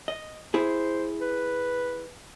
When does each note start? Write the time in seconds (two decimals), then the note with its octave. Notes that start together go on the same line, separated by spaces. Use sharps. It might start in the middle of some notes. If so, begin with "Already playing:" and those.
0.08 D#5
0.54 E4 G#4 C5
1.21 B4